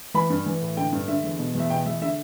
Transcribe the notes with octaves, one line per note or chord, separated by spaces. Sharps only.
E3 B5
G2
E3
A2
D3 G5
G2
D3 E5
E2
B2
E2 E5
B2 G5
E2 E5
D3 E5